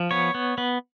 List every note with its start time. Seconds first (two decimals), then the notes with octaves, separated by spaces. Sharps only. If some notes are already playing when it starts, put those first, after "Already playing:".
Already playing: F3
0.11 B3 C#5
0.35 B3
0.58 B3